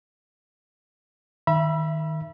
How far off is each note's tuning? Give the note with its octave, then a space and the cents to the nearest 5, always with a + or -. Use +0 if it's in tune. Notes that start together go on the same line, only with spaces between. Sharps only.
D#3 +0 E5 +20 B5 -25